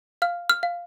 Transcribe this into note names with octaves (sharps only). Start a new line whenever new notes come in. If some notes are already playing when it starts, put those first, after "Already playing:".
F5 F6
F6
F5